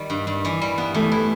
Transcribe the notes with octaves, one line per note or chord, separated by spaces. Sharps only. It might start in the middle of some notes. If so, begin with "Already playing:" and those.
Already playing: D#3 G3
G2
G2
E3
G3
B3
E3 A3
E4